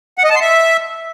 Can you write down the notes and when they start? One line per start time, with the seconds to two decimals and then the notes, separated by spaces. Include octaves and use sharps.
0.18 F#5
0.24 D#5
0.30 A5
0.35 C6
0.41 E5